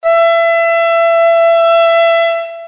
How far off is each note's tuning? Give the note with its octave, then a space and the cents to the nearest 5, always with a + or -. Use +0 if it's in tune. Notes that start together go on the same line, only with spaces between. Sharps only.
E5 +25